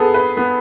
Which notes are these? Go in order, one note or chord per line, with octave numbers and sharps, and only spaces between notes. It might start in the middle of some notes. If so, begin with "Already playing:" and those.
Already playing: B3 G#4 A4
B4
B3